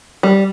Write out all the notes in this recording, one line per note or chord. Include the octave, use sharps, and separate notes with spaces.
G3